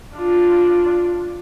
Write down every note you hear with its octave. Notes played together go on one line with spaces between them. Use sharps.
D4 F4